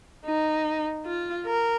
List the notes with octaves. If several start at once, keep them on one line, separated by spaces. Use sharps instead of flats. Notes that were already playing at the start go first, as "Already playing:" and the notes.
D#4
F4
A#4